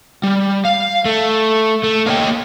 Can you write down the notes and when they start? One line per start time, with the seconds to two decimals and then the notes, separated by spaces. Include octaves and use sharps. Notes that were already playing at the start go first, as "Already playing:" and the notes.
0.23 G3
0.65 F5
1.05 A3
1.84 A3
2.06 A#3 A#4 C#5 D#5 G5